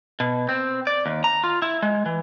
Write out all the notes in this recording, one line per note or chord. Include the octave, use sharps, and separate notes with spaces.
B2
C4
D5
D#2
A#5
F4
E4
G#3
E3